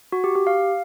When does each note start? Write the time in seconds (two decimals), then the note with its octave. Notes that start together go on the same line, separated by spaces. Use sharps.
0.12 F#4
0.24 G4
0.35 G4
0.47 F5